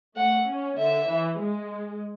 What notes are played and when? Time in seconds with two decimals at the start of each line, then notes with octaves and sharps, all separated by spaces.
0.17 A3 F#5
0.48 C#4
0.78 D3 E5
1.09 E3
1.40 G#3